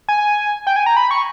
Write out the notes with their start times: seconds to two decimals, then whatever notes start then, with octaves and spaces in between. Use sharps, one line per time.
0.09 G#5
0.67 G5
0.76 G#5
0.86 A#5
0.97 B5
1.11 C#6